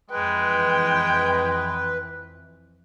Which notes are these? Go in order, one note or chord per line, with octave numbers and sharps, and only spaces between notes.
F2 E3 G#3 B4 G5